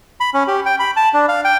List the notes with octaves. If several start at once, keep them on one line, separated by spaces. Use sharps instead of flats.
B5
C#4
G4
G5
B5
A5
D4
F5
G5